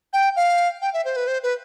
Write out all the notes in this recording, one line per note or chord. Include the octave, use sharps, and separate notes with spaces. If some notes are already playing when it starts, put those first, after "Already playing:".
G5
F5
G5
E5
C5
B4
C5
B4